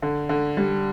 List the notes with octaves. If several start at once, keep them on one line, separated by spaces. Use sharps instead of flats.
D3
D3
G3